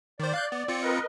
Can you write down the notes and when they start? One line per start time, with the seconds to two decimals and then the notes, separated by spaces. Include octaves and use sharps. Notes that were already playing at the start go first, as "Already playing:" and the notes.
0.19 D#3 C5 D5
0.34 F5 F#6 G6
0.52 B3
0.68 C4 F4 C#7
0.83 A#4 B4 D#5